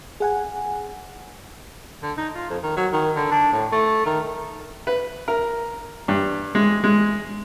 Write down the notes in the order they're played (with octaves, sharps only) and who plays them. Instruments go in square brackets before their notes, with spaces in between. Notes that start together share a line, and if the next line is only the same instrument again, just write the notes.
[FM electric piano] G#4 F#5 G#5
[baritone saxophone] D3
D#4
F4
F2
D#3
F#3
D#3
D3
D4
A2
A3
D#3
[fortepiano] B4
A#4
G2
G#3
G#3